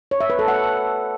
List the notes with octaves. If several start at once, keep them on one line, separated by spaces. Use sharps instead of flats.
C#5
E5
B4
A4
F#5